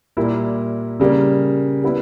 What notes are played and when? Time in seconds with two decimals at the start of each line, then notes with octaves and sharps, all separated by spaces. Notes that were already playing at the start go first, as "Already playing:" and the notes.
0.17 A#2 G3 A#3 E4
1.00 C#3 G3 A#3
1.83 G3 B3 E4